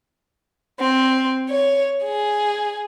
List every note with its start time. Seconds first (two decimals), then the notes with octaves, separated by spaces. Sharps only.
0.79 C4
1.49 C#5
2.03 G#4